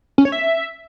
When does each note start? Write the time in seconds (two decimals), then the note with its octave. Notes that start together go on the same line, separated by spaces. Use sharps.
0.18 C#4
0.25 C#5
0.32 E5